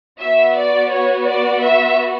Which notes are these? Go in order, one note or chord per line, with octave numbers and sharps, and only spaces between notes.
B3 F#4 E5
D5
C#5
D5
E5